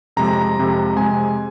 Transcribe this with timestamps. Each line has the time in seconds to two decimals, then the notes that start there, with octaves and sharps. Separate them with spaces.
0.17 F2 C3 G#3 A#5
0.57 F2 C3 G#3
0.96 F2 C3 G#3 G#5